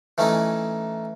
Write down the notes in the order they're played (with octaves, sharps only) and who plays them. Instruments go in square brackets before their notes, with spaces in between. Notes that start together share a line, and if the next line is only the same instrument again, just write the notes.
[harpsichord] E3 A3 C#4 D#4 E4